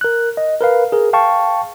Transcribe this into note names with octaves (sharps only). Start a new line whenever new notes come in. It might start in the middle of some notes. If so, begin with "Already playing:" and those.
A#4 F#6
D#5
A#4 B4 F5
G#4 A#4
F5 G5 A5 C#6